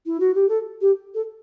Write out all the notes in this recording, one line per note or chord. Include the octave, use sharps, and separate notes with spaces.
E4
F#4
G4
A4
G4
A4